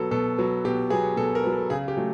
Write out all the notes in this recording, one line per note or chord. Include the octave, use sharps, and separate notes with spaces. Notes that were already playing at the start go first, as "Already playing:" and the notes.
Already playing: B2 F#3 B3 A4
B2 A4
F#3 B3
B2 G4
F#3 B3 G#4
B2 A4
A#4
F#3 B3
A4
C#3 G#4
G4
F#3 A3